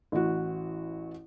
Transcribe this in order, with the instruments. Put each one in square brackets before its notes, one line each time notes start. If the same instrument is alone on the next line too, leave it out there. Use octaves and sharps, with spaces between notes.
[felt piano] A1 E3 F#4